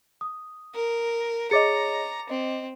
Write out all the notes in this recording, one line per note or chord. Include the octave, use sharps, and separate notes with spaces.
D#6
A#4
G#4 C#5 D#5 A#5 D6 A6 C#7
C4 D#5